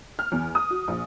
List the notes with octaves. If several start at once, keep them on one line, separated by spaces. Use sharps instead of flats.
F6
E2
D#6
F#4
A#1